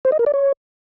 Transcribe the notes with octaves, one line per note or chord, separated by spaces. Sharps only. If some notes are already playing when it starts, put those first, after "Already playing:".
C5
D#5
A#4
D5
C#5